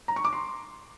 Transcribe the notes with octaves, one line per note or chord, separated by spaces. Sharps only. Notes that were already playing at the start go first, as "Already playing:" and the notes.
A#5
C#6
D6
C6